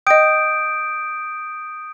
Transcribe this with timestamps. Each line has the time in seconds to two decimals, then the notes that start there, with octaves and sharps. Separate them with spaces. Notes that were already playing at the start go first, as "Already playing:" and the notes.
0.07 D#5 G5 D#6 G6 D7